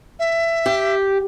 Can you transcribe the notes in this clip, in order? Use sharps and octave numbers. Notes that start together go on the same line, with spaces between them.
E5
G4